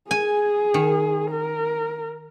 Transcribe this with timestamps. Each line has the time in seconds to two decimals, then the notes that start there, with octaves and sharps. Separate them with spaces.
0.11 G#4 G#5
0.74 D#3
1.31 A#4